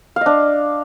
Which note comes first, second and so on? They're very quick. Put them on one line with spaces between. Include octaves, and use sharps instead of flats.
F5 D#5 D4